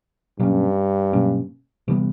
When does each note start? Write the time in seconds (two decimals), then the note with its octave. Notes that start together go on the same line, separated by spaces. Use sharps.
0.39 G2 B2 F#3 A#3 C#4
1.13 B2 F#3 A#3 C#4
1.88 C3 E3 G3 B3